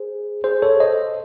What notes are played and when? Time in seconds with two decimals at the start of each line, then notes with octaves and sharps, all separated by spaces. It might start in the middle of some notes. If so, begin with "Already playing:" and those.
Already playing: G#4 C5
0.44 G#4 C5
0.62 A4 C#5
0.80 C5 D#5